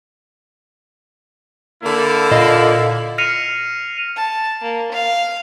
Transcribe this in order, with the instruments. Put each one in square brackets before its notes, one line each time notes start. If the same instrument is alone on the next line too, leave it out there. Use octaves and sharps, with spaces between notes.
[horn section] D3 A#3 E4
[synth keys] A#2 D#5 F5
[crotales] F6 A#6 C7 C#7 D#7 F7
[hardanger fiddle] A5
A#3
F5